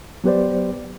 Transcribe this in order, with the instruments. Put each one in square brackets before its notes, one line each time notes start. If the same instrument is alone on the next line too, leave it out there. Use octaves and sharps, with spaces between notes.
[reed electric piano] F#3 B3 G4 B4 C5 D5